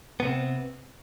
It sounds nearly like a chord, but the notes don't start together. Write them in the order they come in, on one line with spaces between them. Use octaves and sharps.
B3 C3 C4